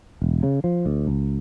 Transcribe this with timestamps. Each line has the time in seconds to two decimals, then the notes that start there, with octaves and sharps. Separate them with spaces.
0.22 E1
0.43 C#3
0.64 F3
0.86 D2
1.07 C#2